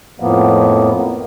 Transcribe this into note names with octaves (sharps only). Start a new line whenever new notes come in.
F2 A2 F3 A#3 B3